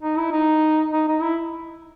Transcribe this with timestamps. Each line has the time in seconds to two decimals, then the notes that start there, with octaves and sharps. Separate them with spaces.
0.02 D#4
0.17 E4
0.32 D#4
0.92 D#4
1.08 D#4
1.22 E4